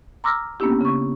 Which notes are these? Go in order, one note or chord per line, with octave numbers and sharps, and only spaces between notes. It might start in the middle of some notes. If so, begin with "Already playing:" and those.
A#5 C6 D6 E6 F6 A#6
A#3 B3 C#4 D4 E4 G4
C#3 C#6